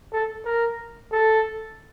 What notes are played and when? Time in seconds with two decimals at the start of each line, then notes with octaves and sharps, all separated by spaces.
0.13 A4
0.46 A#4
1.12 A4